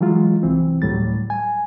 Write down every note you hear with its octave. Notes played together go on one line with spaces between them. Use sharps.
E3 F#3 G#3 F4
C2 E3 C4
D2 A2 F#3 G3 A6
G#5